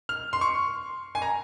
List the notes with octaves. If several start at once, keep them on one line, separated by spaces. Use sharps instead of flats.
F6
C6
C#6
G#5
A#5